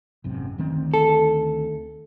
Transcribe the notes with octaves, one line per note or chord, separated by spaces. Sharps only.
G#1 F#2 C3
D2 D#3 C4
A4